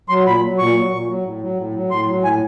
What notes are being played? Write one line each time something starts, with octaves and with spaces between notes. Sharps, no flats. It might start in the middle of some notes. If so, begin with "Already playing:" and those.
F#3 C6
A#2 B5
F#3
A#2 C#6
F#3
A#2
F#3
A2
F#3
A2
F#3
A2 C6
F#3
A2 G#5